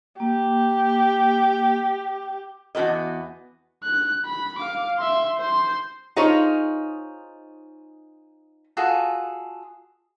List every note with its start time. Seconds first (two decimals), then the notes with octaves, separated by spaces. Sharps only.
0.20 A#3 G4
2.75 E2 B3 F#4 B4 D#5
3.83 F#6
4.25 B5
4.59 F5 D6
4.97 E5 C6
5.38 C5 C6
6.16 D#4 F4 G#4 C5 C#5
8.77 F4 F#4 G#4 A4